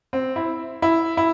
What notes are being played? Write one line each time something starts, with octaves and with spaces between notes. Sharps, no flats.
C4
E4
E4
E4